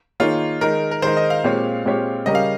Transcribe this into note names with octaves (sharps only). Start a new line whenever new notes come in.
D#3 A#3 D#4 F4 G#4 C#5
D#3 G#3 D#4 A#4
A#4
D#3 G#3 D#4 C5
D#5
F5
A#2 G#3 C4 G4 C#5
A#2 G#3 C4 G4 C#5
C#3 G3 C#4 G4 A#4 D#5
F5